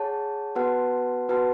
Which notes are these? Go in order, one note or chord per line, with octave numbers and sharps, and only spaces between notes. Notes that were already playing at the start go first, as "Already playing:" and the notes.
Already playing: G#4 C#5 F#5 A5
B3 F#4 B4 F#5 A5
B3 F#4 B4 F#5 A5